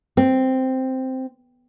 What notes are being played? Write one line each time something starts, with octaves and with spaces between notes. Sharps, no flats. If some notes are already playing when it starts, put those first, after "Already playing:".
C4